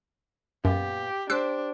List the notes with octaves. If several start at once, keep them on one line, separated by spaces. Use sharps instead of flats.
F#2 A#2 B3 G4
D4 G4 C5 E6 F#6 C7